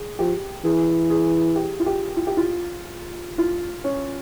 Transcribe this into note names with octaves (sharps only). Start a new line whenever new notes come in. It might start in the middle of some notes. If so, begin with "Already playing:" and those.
Already playing: G#4
F3 G4
E3 G#4
G#4
G4
F4
G4
F4
G4
F4
F4
C#4